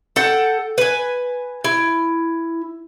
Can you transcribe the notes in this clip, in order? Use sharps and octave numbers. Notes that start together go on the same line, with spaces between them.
A4 F#5 G5
B4 G#5
E4